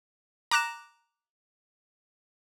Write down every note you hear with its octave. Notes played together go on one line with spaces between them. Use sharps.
A#5 D6 F#6 A#6 E7